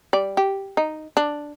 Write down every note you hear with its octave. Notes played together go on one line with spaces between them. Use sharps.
G3 D5
G4
D#4
D4